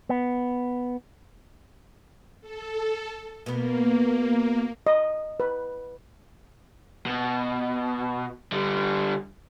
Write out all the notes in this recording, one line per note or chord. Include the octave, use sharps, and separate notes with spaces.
B3
A4
B2 A#3 B3
D#5
B4
B2
D3 G3